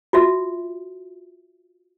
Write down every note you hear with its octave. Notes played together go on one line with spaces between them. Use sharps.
F4 F#4 E5